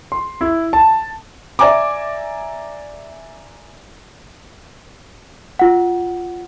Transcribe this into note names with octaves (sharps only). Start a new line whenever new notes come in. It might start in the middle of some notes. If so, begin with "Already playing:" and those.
C6
E4
A5
D5 E5 G#5 A#5 D6
F4 F#5